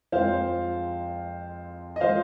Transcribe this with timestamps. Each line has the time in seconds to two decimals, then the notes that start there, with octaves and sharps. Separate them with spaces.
0.12 F2 F3 G#3 C5 F5
1.96 D#5
2.01 F3 G#3 C5 F5